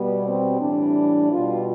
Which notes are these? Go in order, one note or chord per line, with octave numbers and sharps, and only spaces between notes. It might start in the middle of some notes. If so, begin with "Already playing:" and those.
Already playing: B2 G3 B3
C4
A2 E3 G3 D4
B2 G3 F4